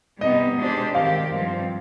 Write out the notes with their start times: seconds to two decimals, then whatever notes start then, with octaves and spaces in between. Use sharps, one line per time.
0.21 C3 G3 B3 D#4 D#5
0.58 B2 G#3 D4 G4 C5
0.95 D#3 G#3 C4 G4 F5
1.31 G2 F3 C4